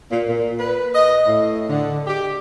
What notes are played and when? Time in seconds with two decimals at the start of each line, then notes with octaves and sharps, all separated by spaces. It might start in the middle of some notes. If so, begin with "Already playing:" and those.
0.10 A#2
0.28 A#2
0.59 B4
0.95 D#5
1.26 A2
1.68 D3
2.07 G4